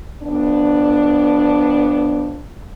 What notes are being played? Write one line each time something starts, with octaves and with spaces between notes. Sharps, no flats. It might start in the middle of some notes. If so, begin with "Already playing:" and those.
F2 B3 D4